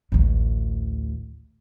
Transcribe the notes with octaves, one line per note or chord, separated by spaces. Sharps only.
A1 D2